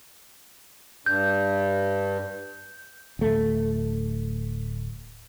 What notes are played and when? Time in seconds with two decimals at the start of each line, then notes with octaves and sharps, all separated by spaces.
1.06 G2 G6
3.19 D1 A3